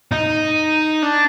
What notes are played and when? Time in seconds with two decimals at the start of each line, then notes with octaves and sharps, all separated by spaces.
0.12 D#4
1.03 D4